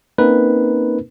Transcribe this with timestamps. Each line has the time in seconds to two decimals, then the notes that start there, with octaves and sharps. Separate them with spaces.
0.18 A#3 C4 C#4 D#4 A#4 B4